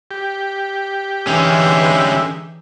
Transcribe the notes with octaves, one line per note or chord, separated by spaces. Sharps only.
G4
D3 E3 G#3 C#4 D#4 E5